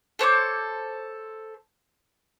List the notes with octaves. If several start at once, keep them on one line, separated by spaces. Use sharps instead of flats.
A4 C5 C#5 D6